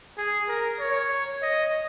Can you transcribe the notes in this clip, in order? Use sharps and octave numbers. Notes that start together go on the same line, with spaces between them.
G#4
A#4
C#5
D#5